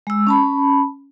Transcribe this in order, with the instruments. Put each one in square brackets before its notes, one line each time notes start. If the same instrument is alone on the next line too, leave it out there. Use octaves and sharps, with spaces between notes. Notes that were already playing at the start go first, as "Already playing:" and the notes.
[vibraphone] G#3 E6
C#4 A5 B5